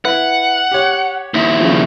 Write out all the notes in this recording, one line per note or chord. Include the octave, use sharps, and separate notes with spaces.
E4 B4 F#5
G4 C#5
D#2 E4
C#3 F3